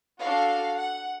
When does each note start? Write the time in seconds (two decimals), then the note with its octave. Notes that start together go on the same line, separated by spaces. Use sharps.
0.21 D4 F#4 A4 F5
0.78 F#5